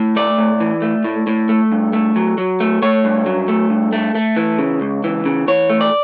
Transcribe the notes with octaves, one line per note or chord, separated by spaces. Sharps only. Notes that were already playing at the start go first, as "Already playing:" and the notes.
Already playing: A2
A3 D5
A2
E3
A3
A2
A2
A3
G2
A3
F#3
F#3
A3
A3 C#5
G2
F#3
A3
G2
A3
A3
E3
C#3
C#2
E3
C#3
E3 C#5
A3
D5